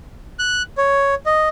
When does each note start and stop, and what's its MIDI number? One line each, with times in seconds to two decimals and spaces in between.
0.39 0.62 90
0.78 1.15 73
1.26 1.49 75